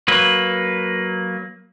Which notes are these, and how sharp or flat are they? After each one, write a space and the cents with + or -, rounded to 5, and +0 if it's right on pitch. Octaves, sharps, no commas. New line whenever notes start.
F#3 +0 A#3 +5 B4 +0